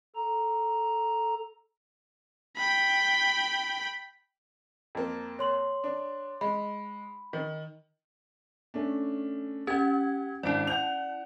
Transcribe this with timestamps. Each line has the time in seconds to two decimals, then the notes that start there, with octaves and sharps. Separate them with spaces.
0.16 A4 A#5
2.57 G5 B5
4.95 F2 A#3
5.39 C#5 C6 F#7
5.84 D4
6.41 G#3 B5
7.33 D#3
8.74 A3 C#4 D4
9.67 C#4 G4 F#5 G#6
10.43 G#1 D4 E4 D5 D7
10.67 F#5 G6 F7